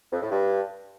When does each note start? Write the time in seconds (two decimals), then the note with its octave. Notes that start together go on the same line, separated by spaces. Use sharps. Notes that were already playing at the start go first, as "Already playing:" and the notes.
0.12 F2
0.21 A2
0.31 G2